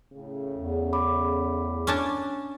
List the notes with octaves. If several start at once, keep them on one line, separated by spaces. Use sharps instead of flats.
A2 C#3
E2
B5 D6
C#4 D4 A5